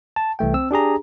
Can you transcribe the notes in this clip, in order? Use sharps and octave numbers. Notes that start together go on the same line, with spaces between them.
A5
C2 E3 A3 G5
C4 E6
D4 G4 G#4 A#5